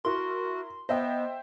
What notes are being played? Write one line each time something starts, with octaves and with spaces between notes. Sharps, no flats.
E4 F#4 A#4 C6
B3 C5 D#5 E5 G5